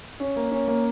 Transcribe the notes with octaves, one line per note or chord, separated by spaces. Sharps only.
C#4
A#3
C#4
A#3